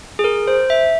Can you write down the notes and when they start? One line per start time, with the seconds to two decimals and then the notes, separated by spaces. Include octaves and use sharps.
0.19 G#4
0.24 A#4
0.48 C5
0.70 E5